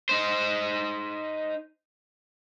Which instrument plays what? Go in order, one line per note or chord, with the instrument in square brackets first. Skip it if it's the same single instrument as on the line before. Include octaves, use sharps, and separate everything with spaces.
[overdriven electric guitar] D#4 C5